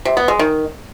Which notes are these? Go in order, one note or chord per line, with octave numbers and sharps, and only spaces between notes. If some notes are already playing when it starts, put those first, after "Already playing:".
C3
B3
G#3
D#3